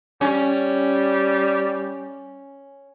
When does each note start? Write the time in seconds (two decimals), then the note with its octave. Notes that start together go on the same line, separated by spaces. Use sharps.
0.21 G3 C#4